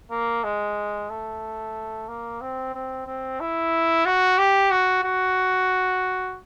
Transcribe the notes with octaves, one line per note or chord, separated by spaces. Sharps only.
A#3
G#3
A3
A#3
C4
C4
C4
E4
F#4
G4
F#4
F#4